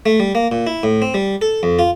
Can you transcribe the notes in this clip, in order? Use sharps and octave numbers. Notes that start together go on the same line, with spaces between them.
A3
G3
A#3
A#2
E4
A2
C4
G3
A4
F2
F4